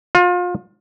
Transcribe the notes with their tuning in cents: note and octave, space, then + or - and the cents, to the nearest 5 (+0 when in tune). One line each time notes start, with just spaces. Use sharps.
F4 +30